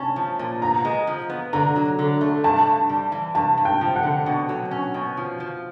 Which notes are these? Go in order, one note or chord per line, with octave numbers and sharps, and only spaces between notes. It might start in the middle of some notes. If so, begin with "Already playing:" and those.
Already playing: C#4 A5
F3
A#2
B3 A#5
G#3
F3
B3
D3 A#5
F#3
D3
A3
G2 A5
G2
G3
E3
G2 A5
G2
G5
F3
F#5
D3
B2
F#3
C#4
B2
F3
F3